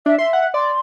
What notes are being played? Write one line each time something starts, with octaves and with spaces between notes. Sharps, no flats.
D4 E5
E5 C6
F#5
D5 C6